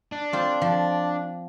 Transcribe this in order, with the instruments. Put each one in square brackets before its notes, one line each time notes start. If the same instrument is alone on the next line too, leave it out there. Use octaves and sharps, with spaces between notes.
[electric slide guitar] D4
[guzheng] C4 F4 C5
F3